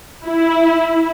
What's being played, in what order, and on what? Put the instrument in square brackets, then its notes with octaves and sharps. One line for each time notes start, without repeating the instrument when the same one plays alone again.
[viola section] E4